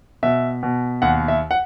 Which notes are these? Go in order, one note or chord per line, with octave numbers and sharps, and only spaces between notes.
B2 E5
B2
D#2 F#5
E5
F#5